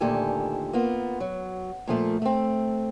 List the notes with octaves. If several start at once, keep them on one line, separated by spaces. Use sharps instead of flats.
D2 A#2 D#3 G4 A4 G#5
A#3 B3 F4
F#3
A#2 F3 A3
A3 C4